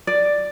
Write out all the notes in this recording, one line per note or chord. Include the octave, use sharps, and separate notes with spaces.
D5